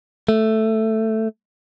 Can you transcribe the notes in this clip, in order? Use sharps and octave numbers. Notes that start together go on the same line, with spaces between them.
A3